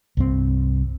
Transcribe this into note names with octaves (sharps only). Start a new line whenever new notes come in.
C2 G2 C4